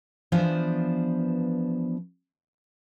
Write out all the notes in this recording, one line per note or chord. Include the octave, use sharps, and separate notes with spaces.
E3 F3 B3 D4 C5 F5